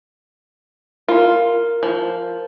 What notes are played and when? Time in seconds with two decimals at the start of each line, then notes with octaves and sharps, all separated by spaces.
1.08 F4 A#4
1.83 F3